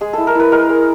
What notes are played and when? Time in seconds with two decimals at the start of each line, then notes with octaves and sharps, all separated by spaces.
0.01 G#3 G#4
0.13 E4 A4
0.27 A#4
0.35 E4 B4
0.52 G#3 A#4
0.69 G#3